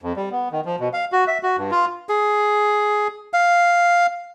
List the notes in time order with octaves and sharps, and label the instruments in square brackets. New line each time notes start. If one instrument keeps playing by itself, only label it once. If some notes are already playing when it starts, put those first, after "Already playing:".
[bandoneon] F2
G3
B3
D#3
F3
B2
F5
F#4
E5
F#4
G2
F4
[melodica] G#4
F5